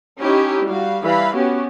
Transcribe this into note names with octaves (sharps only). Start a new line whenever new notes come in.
C#4 D#4 E4 G4
G3 F#4 F5
E3 G3 F5 B5
B3 C#4 F#4 G4